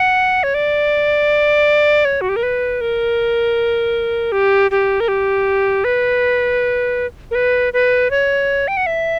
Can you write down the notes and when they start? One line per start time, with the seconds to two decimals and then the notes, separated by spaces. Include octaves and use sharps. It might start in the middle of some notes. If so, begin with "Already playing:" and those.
Already playing: F#5
0.43 C#5
0.54 D5
2.05 C#5
2.21 F#4
2.29 G4
2.36 A#4
2.43 B4
2.81 A#4
4.32 G4
4.71 G4
5.00 A#4
5.08 G4
5.84 B4
7.31 A#4
7.35 B4
7.73 B4
8.11 C#5
8.68 G5
8.77 F#5
8.86 E5